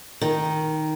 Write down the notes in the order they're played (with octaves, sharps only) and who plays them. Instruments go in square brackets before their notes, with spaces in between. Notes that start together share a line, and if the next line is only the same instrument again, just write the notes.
[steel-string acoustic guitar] D#3